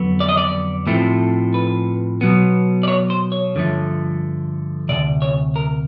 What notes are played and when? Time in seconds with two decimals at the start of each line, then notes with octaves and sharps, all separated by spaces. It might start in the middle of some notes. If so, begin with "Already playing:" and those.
Already playing: F2 D3 F#3 B3
0.20 D5
0.29 D#5
0.37 D5
0.87 A2 F3 A3 C4
1.54 B4
2.21 B2 F#3 B3
2.83 D5
2.88 C#5
3.10 C5
3.32 C#5
3.55 G2 D3 F3 A3
4.89 D2 C3 D5
5.22 C#5
5.56 A#4